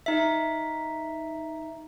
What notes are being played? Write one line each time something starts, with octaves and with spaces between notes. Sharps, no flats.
D#4 E5